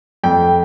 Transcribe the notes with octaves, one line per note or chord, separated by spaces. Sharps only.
F2 G5